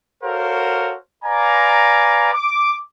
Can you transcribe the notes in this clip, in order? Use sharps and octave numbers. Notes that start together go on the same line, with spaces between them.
F#4 A4 A#4 C5 C#5 F5
B4 D5 F5 G#5 A#5
D6